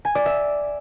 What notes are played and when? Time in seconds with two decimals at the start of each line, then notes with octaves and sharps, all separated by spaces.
0.05 G#5
0.15 D5
0.26 E5